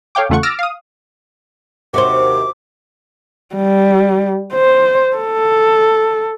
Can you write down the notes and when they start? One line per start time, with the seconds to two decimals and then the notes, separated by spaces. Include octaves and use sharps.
0.15 A4 C#5 F5 G5 D6
0.29 E2 C#3 A3 F4 F#5 C#6
0.43 D6 E6 F6 A6 A#6 D7
0.59 F5 D#6
1.94 D#2 C3 F#4 C5 D6
3.55 G3
4.54 C5
5.17 A4